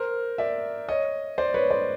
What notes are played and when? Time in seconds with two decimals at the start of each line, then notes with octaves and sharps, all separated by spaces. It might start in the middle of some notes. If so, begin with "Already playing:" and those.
Already playing: A#4 C5
0.38 D5 E5
0.88 C#5 D#5
1.38 C5 D5
1.54 B4 C#5
1.71 C5 D5